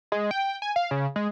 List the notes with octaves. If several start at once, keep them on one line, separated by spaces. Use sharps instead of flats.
G#3
G5
G#5
F5
C#3
G#3